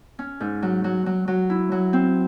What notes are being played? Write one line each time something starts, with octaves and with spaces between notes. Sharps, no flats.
C#4
G#2
F#3
F#3
F#3
F#3
E4
F#3
C4